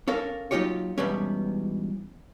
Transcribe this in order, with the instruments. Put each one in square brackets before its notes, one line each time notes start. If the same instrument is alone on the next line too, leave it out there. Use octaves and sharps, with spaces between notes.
[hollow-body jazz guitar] C#4 A4 A#4 F5
F#3 A#3 D#4 F4 G4 C#5
E2 G#2 B2 G3 B3 C#4